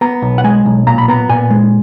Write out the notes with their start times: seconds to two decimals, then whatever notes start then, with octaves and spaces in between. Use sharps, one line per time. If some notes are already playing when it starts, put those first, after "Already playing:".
0.01 B3 A#5
0.22 B1
0.38 F#5
0.44 G#3 G#5
0.66 B1
0.87 A#2 A#5
0.98 B5
1.08 B3 A#5
1.29 A#2 G#5
1.50 G#3